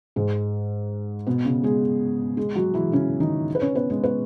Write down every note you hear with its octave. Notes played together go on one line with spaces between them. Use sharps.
G#2 G#3
B2 B3
C#3 C#4
G#3 G#4
G#3 G#4
F#3 F#4
E3 E4
C#3 C#4
D#3 D#4
B4
C#4 C#5
B3 B4
G#3 G#4
B3 B4